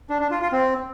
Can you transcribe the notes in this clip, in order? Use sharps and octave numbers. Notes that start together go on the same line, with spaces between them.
D4
D4
F4
F4
C4